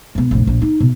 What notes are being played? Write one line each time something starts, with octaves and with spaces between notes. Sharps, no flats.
G#2 B2
F1 A#1
A#1
D#4
B2